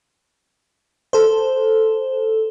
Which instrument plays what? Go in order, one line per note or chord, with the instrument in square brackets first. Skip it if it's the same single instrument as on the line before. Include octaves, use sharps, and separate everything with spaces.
[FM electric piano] A4 C5